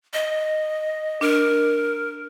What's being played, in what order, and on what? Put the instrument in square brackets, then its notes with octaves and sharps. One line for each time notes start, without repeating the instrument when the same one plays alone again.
[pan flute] D#5
[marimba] D4 [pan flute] A#4